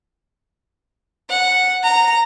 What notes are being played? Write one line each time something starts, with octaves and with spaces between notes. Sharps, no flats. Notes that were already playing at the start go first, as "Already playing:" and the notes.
F#5
A#5